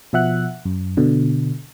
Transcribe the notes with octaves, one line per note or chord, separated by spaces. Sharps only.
B2 F3 E5 F#5 F#6
F#2
B2 D3